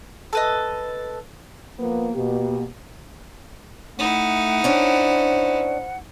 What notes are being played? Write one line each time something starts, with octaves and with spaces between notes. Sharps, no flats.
A4 B4 D#5
F3 A#3 B3
B2 A#3 G4
A3 D#4 E4 F#5
C#4 D4 C5